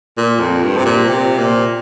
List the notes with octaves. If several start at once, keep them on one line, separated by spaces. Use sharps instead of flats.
A#2
F2
G2
C3
A#2
C3
A#2